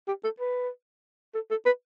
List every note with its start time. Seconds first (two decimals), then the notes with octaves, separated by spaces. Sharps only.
0.08 G4
0.24 A4
0.40 B4
1.35 A4
1.51 A4
1.66 B4